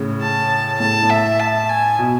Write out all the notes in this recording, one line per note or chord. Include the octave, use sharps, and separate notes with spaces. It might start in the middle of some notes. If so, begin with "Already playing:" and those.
Already playing: A2 C#3
A5
A2 A5
A2
E5
A5
G#5
B2